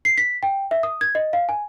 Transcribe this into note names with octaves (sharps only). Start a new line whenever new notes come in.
C7
B6
G5
E5
D#6
G#6
D#5
F5
G#5